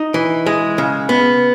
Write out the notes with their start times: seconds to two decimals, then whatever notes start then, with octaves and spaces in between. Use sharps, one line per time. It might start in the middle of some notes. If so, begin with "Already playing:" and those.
Already playing: D#4
0.14 E3
0.46 G#3
0.78 C#3
1.09 B3